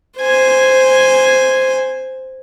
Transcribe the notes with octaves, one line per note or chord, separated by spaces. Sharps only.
C5 G#5